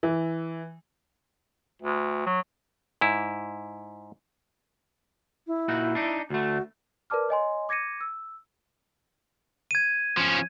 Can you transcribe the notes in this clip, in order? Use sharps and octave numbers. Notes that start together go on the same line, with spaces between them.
E3
D2
F#3
G#2 E4
E4
A#2 D#4 F#4
D4 D#4
D2 A3 F#4
A#4 B4 D5 A5 D6 F6
C#5 D#5 G#5 C6
D6 G#6 A#6 C#7 D#7
E6
G#6 D#7
F3 C#4